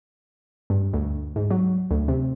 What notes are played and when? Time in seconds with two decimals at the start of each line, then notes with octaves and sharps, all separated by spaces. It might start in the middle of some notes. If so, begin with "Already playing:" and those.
0.70 G2
0.93 D2
1.36 G#2
1.51 F#3
1.91 D2
2.08 C3